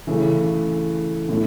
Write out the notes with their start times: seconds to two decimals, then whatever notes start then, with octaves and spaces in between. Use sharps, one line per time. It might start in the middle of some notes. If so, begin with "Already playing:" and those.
0.07 C#3 E3 A3
1.29 A2 A3